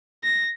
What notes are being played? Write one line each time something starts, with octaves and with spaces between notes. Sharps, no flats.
A#6